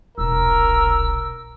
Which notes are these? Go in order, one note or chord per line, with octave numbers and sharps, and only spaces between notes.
D#1 B1 A#4 E6